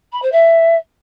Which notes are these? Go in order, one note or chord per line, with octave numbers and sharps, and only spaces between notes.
B5
C5
E5